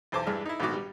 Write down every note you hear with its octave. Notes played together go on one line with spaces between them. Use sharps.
B1 E2 C5 A5 D6
G2 E3 G#3 D4 F6
D#4 E4
A#1 G#2 D#3 B3 F#4 D6
G3